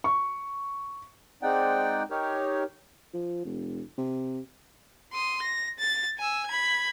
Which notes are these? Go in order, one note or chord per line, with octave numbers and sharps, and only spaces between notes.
C#6
G#3 C4 D#4 D5 F#5 G5
D#4 G4 A#4 C#5
F3
F1
C3
C6 D#6
A#6
A6
G#5 E6
B5 G#6